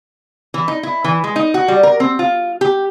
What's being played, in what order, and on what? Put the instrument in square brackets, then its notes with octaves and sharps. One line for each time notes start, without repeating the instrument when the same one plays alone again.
[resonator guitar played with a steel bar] E3
D#4
E4
E3
G#3
D#4
F#4
G3
A#4
C4
F4
G4